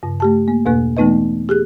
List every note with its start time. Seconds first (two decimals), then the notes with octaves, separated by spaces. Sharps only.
0.03 G2 C#3
0.20 A3 G4 A5
0.48 A#3
0.66 E2 B2 A#3 B4 F#6
0.97 E3 A3 B3 D#4 B4 D#5
1.49 G4 G#4 F#6